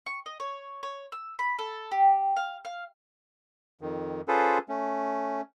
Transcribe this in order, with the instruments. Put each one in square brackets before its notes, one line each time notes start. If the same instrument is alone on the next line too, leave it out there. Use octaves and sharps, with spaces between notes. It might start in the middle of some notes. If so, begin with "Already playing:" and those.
[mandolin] C#6
D#5
C#5
C#5
E6
B5
A4
G4
F5
F5
[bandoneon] F2 D#3
C#4 F4 G#4 A4 B4 C5
A3 C#4